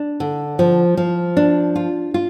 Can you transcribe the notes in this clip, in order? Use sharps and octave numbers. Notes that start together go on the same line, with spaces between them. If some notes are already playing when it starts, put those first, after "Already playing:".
Already playing: D4
D3
F3
F3
D4
F4
F4